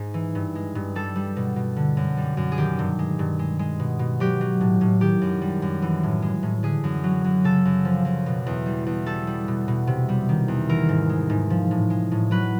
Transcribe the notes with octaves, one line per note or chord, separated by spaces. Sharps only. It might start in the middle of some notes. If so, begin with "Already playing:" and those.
Already playing: G#2 G#4
E3
G2
G#3
G2
G3 A4
G3
B2
B2
D3
F#2
G3
F#2
G#4
D#3 G4
G2
G#3
G2
G#3
G#3
B2
B2
F#3 G4
F#3
A2
A2
D#3 G4
F#2
G3
F#2
E3
A2
G#3
A2
D3 G#4
F#2
F#3
F#2
C#3 A4
F#2
F3
F#2
B2
E2
G3
E2
G3 A4
G3
B2
B2
C3
G3
D#3
E2
E3 A#4
G#2
G#3
G#2
F3
A2
G#3
A2
F#3 B4